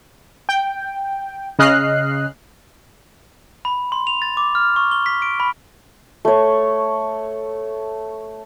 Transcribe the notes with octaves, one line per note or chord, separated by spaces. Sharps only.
G5
C#3 D#5 F6 F#6 C7
B5
C6
F7
A6
D6
F6
C#6
G7
B6
D7
B5
A3 C#5